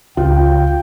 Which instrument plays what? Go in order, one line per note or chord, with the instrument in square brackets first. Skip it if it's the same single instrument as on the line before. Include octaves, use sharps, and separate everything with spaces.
[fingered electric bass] C#2 [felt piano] F4 [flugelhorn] G5